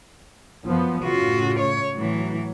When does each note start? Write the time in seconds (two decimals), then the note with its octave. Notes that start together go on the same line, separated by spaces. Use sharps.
0.65 F#2 F3 B3
1.04 A2 C#3 F4 F#4
1.59 C#5
1.96 A2 E3 F#3